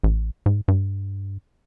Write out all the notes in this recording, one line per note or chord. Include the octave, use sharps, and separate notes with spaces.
A1
G#2
G2